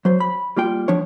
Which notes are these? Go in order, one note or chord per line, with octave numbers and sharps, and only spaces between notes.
F#3 C5
B5
G3 A#3 F4 G5
F3 D4 C#5